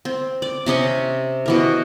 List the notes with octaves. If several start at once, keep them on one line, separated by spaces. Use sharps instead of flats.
C4
D5
C3 C#4 D#5 C#6
B2 E3 A#4